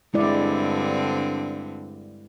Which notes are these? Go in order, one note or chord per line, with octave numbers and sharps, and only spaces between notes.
G2 D3 G#3 C4 E4 D5